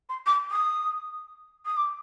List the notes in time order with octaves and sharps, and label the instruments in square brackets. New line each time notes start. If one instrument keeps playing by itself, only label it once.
[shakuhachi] C6
D6
D#6
D#6
D6